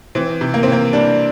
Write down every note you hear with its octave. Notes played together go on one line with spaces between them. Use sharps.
E3 C4
C3
A#3
C4
E3 A#3
G3 D4